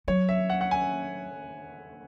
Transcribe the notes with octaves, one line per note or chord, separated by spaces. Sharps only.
F#3 C#5
E5
F#5
F#5
G#5